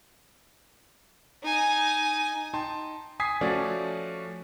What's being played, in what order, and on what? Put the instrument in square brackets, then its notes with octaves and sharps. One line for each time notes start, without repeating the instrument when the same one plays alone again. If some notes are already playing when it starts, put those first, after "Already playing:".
[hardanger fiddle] D#4 G#5
[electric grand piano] D#4 G5 A5 C6
G#5 D#6 G#6 B6 C7
F3 A3 C#4 F#4 C#5 D5